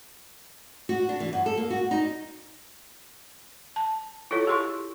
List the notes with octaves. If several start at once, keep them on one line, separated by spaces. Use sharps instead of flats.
F#4
D4
E3
F#2
A4
A#3
F#4
D#4
A5
E4 F4 A4 C#5
G4 G#4 C6 C#6